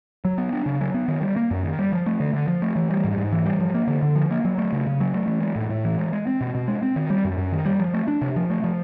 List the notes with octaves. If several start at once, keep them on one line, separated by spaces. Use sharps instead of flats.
F#3
B3
D4
C#3
F#3
B3
D#3
G3
A#3
F#2
D#3
G3
F3
A3
D3
D3
F3
A3
E3
G3
G#2
G#2
E3
G3
F3
A#3
D3
D3
F3
A#3
F#3
A3
C#3
C#3
F#3
A3
E3
G#3
A2
A2
E3
G#3
G#3
C4
B2
B2
G#3
C4
D#3
G3
F#2
F#2
D#3
G3
F3
A3
D4
C3
F3
A3
F3